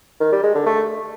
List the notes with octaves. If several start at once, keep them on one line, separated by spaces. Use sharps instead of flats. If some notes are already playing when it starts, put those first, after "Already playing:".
D#3
G3
G#3
D3
A3